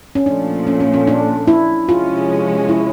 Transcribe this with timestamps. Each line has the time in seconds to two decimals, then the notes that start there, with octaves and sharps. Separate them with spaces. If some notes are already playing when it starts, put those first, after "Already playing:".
0.15 C#4
0.26 A#2 F3 A3 D4
0.67 C#4
0.80 C#4
0.94 C#4
1.07 D4
1.47 E4
1.88 C3 F3 G#3 C#4 F4
2.69 E4